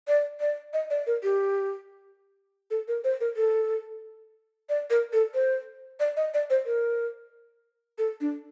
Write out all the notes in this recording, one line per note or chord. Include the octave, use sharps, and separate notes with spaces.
D5
D5
D#5
D5
A#4
G4
A4
A#4
C5
A#4
A4
D5
A#4
A4
C5
D5
D#5
D5
C5
A#4
A4
D4